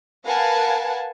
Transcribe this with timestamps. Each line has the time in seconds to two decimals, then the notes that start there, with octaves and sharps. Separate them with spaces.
0.25 A#4 B4 F5 F#5 G#5 A5